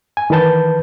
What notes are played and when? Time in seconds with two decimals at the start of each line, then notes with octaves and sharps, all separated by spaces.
0.17 G#5
0.30 D#3 E3 B4 A5 G6